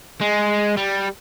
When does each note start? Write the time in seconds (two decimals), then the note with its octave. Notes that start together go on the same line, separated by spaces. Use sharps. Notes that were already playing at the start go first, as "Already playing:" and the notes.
0.21 G#3
0.77 G3